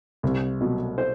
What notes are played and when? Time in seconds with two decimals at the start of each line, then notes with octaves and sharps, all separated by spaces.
0.23 C2
0.61 B2 F#3
0.98 C5